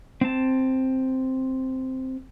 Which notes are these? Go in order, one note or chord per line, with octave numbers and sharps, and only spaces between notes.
C4 A5